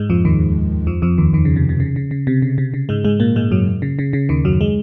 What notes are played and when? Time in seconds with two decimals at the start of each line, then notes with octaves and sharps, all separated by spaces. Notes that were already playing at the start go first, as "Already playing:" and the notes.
Already playing: G#2 G#3
0.10 F2 F3
0.25 D#2 D#3
0.87 F2 F3
1.02 F2 F3
1.18 D#2 D#3
1.33 D#2 D#3
1.45 C#3
1.56 C3
1.69 C3
1.80 C#3
1.96 C#3
2.11 C#3
2.27 C3
2.42 C#3
2.58 C3
2.74 C#3
2.89 G#2 G#3
3.05 G#2 G#3
3.20 A#2 A#3
3.36 G#2 G#3
3.51 F#2 F#3
3.82 C#3
3.99 C#3
4.13 C#3
4.29 D#2 D#3
4.45 F#2 F#3
4.61 G#3